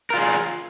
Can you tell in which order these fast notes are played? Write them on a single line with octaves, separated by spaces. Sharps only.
A#4 F4 G#4